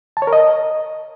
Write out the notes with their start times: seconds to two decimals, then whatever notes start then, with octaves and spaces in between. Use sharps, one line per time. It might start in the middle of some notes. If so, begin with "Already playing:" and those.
0.17 A5
0.22 C#5
0.27 A#4
0.33 D#5